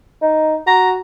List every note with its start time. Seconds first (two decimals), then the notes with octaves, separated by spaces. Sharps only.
0.22 D#4
0.67 F#4 A#5